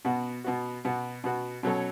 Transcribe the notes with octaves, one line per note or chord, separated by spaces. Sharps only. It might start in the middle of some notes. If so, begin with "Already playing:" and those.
B2 B3 F#4
B2 B3 F#4
B2 B3 F#4
B2 B3 F#4
B2 F#3 C#4 A4 C#5